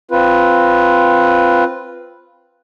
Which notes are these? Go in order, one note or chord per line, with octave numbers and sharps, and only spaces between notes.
C4 F4 B4